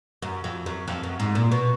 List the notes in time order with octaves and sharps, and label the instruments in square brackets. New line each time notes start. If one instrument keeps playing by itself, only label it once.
[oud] F#2
F2
F#2
F2
F#2
G#2
A#2
B2